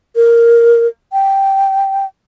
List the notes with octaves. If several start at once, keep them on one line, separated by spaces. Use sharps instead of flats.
A#4
G5